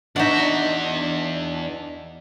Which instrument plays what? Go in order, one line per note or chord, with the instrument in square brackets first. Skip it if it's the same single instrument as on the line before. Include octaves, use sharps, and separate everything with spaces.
[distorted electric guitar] E2 E5 [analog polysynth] D4 [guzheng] D#4 F#4 F#5 [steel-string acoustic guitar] D#5